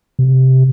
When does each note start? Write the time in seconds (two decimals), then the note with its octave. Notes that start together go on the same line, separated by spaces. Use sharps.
0.19 C3